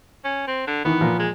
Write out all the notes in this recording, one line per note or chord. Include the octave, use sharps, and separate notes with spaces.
C#4
C4
D3
D#3 E3 B3
A#2 F3
G#3